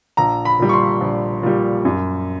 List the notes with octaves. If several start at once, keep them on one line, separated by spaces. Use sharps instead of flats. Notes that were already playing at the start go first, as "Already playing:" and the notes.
A#1 A#5
B5
A#2 G3
C#6
C6
A#1
A#2 G3
F#2